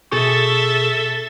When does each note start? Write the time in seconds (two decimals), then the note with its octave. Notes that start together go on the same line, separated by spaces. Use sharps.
0.12 B2 G#4 A4 E5 C#6